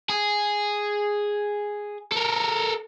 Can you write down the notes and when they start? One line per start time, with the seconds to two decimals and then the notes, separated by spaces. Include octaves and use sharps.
0.09 G#4
2.12 A4 A#4